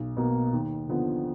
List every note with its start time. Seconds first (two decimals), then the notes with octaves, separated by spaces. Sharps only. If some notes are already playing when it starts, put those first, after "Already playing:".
Already playing: B1
0.17 B2 A#3
0.53 D#2
0.89 D3 F3 B3